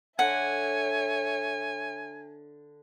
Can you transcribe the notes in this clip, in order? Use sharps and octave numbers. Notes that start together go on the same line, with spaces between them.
D3 C#5 E5 F#5 G#5